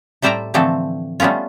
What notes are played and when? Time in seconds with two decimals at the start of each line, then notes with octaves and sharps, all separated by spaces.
0.22 A2 G3 C5 D5 E5 A#5
0.54 D3 E3 F3 A3 C4 A4
1.20 G3 A3 B3 C#4 F4